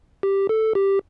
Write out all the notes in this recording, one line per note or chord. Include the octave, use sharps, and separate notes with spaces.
G4
A4
G4